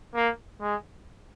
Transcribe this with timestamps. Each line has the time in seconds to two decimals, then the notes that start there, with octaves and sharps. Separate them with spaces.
0.15 A#3
0.61 G#3